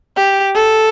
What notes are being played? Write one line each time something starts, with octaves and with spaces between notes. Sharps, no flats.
G4
A4